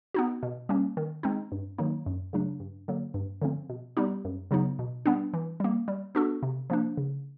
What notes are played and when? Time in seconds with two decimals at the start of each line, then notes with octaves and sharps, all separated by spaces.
0.14 B3 D#4 F#4
0.43 B2
0.69 G3 A#3 C#4
0.97 D#3
1.23 G#3 C4 D#4
1.52 G2
1.78 D#3 F#3 A#3 D#4
2.06 F#2
2.33 C#3 F#3 A3 D4
2.60 G2
2.88 D3 F#3 A#3
3.14 G2
3.42 D3 F3 A3 C4
3.69 B2
3.97 G3 B3 D#4 G4
4.25 F#2
4.51 C#3 F#3 B3 D#4
4.79 B2
5.06 G3 B3 D4
5.34 E3
5.60 G3 A#3
5.88 G3
6.15 B3 D4 F#4 A4
6.43 C3
6.70 F3 A#3 D4
6.97 C#3